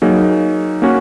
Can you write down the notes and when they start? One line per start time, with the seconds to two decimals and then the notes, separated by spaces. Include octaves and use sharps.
0.02 F#3 A#3 D#4 G#4
0.82 A#3 C#4 F#4